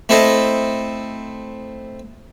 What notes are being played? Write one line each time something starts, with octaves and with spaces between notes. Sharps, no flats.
A3 C4 E4 A4 C5 D#5